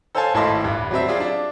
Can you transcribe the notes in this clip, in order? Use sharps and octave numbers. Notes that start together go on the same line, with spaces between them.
A4 C5 C#5 F5 G#5 A5
G#1 A2 E4 D#5 A5 C6
D#1 G2
F#3 G3 C4 E5
F4 G#4 D5
D4